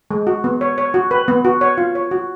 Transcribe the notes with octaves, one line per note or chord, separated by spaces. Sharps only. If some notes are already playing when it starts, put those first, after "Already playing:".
G#3
F#4
B3
C#5
C#5
F#4
B4
B3
F#4
C#5
F4
C#5
F#4